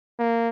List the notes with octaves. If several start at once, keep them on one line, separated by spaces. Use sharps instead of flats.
A#3